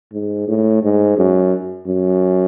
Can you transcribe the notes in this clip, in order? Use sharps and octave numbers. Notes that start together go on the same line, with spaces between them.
G#2
A2
G#2
F#2
F#2